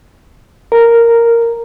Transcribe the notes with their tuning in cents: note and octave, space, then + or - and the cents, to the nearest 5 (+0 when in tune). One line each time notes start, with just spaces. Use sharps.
A#4 -5